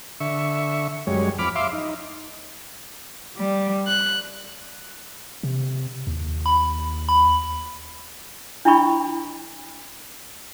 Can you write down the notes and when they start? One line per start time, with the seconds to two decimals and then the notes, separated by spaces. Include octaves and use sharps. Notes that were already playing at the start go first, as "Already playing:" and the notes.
0.20 D3 E5 C#6
1.07 F#2 G3 G#3 C#5
1.39 F2 B5 D6 F6
1.56 E5 F5 C6 D6
1.73 D#4
3.36 G3
3.87 F#6
5.43 C3
6.07 D#2
6.46 B5
7.09 B5
8.65 D4 E4 D#5 G5 B5 C#6